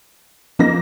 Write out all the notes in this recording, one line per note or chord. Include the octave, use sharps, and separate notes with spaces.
F3 A#3 D#4 A#6